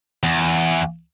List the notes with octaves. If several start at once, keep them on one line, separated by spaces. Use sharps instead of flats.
E2